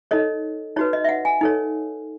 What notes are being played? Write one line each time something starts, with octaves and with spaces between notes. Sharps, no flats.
D#4 A4 C#5 D#5
D#4 F#4 B4 C#5
D#5
E5
F#5
G#5
D#4 A4 C#5